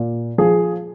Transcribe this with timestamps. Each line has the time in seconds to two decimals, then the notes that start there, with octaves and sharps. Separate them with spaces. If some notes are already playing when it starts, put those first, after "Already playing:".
Already playing: A#2
0.38 F3 G#4